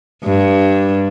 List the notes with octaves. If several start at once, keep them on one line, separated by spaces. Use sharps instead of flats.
G2